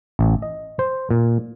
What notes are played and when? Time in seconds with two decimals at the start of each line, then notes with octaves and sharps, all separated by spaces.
0.19 A1
0.42 D#5
0.79 C5
1.11 A#2